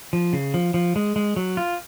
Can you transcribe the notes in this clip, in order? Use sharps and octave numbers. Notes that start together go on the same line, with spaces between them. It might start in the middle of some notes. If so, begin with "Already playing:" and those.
F3
C#3
F3
F3
G#3
G#3
F#3
F4